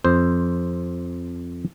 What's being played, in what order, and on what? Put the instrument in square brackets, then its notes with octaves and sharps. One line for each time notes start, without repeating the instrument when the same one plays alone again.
[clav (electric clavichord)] F2 C5